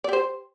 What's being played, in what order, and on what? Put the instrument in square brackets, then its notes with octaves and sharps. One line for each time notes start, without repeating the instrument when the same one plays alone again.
[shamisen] D5
G4
C5